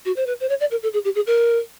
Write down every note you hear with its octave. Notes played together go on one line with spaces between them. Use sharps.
F#4
C5
B4
C5
C#5
D5
A#4
A4
G#4
G4
G#4
A#4